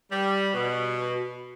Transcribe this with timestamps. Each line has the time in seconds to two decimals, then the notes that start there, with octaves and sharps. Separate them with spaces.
0.11 G3
0.54 B2